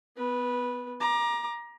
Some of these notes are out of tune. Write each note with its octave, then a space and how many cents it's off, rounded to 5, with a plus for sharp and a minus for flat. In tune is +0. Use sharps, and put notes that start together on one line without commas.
B3 +20 B4 -15
A#5 +25 D6 +25